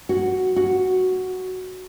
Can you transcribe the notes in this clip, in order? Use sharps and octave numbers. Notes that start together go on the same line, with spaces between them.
F#4
F#4